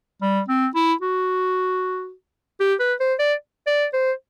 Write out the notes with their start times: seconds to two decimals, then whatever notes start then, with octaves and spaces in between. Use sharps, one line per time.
0.22 G3
0.48 C4
0.75 E4
1.01 F#4
2.60 G4
2.80 B4
3.00 C5
3.19 D5
3.67 D5
3.93 C5